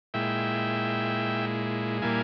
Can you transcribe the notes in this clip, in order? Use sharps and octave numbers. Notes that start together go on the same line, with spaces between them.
A#2 G#3 E4 E5 G5
A#2 G3 A#3 E4 F5 G#5